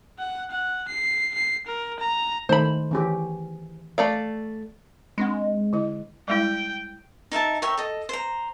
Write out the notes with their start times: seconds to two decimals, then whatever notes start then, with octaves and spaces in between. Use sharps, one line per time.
0.19 F#5
0.51 F#5
0.88 C7
1.34 C7
1.67 A#4
2.00 A#5
2.49 D#3 A3 C5 B5
2.91 E3 C#4 G4
3.98 A3 D5 F5
5.18 G#3 C4 D4 F#5
5.73 D3 E4 D#5
6.28 G3 G#3 E4 G5
7.32 D#4 A#4 E5 A5
7.62 A#4 C#5 E5 G5
7.78 A4 D#5
8.09 C5 A#5